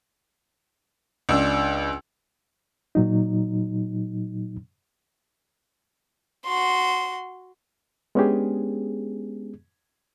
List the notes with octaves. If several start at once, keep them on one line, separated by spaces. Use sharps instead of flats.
C#2 D4 E6
A#2 F#3 D#4
F#4 C6
G#3 B3 C#4 D4 G4 G#4